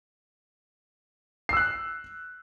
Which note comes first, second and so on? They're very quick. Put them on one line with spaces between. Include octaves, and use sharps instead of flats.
C7 E6 F#6